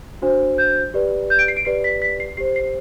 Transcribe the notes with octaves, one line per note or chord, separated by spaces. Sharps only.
D4 F#4 C5
G6
G4 B4 D5
G6
D7
C7
D7
G4 B4 D5 C7
B6
B6
C7
G4 C5 C7
C7